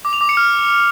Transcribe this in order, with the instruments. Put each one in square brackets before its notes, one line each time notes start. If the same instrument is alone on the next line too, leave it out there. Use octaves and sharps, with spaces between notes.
[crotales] D6
F7
D6
C#7
F6